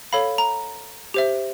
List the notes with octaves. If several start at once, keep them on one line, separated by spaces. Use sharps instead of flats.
A4 C#5 F5 B5
A#5
G4 C5 E5